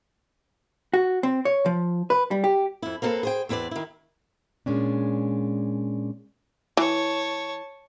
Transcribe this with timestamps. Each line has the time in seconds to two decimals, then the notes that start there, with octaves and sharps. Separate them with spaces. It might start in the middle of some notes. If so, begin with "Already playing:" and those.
0.94 F#4
1.23 C4
1.45 C#5
1.66 F3
2.10 B4
2.31 G3
2.44 G4
2.82 F2 E4
3.02 A#3 C4 D#4 G#4 A4 B4
3.23 G#4 C5 G5
3.49 E2 C4 E4 B4 D5
3.71 D#3 E4
4.66 A#2 G#3 C#4 D4
6.77 E3 C#5 A5